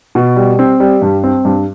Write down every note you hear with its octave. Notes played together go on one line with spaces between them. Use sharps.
B2
G3
C4
G3
G2
C4
G2